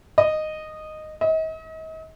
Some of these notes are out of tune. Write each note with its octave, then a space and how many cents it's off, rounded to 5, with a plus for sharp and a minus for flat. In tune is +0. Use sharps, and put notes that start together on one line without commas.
D#5 -10
D#5 +40